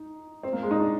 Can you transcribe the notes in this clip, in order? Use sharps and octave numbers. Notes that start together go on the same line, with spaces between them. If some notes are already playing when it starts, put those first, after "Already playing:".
Already playing: D#4
C4
A#3
G#3
D#4
D4